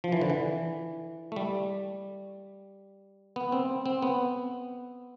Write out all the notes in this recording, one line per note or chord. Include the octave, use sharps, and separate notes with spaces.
F3
E3
D3
E3
A3
G3
B3
C4
C4
B3